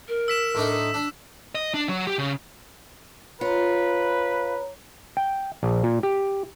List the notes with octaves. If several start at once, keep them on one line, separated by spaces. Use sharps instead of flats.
A#4
E6 B6 E7
A2 D4 D#4
D4
D#5
D4
F#3
G4
C#3
F4 B4 C#5 A#5
G5
A#1
A#2
G4